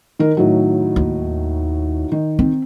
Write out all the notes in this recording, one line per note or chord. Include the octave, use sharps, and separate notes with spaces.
D#3 A#4
A2 D#3 F#3
D#2
D#3
C4